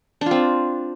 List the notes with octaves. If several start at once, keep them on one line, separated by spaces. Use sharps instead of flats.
C4 D4 F4